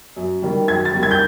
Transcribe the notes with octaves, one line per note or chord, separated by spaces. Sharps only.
F#2
D#3 G3
F#2 G#6
A6
D#3 G3
G#6
G6